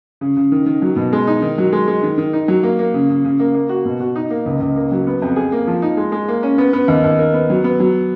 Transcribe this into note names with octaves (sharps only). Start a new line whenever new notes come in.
C#3
C#3
D#3
D#3
F#3
B2
G#3
D#4
D#3
F#3
G#3
G#3
D#3
D#3
D#4
F#3
A#3
A#3
C#3
C#3
C#3
A#3
A#3
F#4
B2
F#4
D#4
A#3
C#2
C#2
A#3
F#3
B3
F2
G#4
A#3
F3
D#4
G#3
G#3
A#3
C#4
B3
B3
D#2
D#2
A#4
B3
F#3
B3
F#3